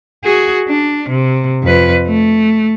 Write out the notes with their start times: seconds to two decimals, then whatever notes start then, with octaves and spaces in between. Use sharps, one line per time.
0.24 F#4 G#4
0.69 D4
1.09 C3
1.63 F2 B4
2.07 A3